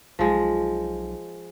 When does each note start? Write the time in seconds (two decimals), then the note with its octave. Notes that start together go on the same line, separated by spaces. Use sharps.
0.19 B1 F3 G#3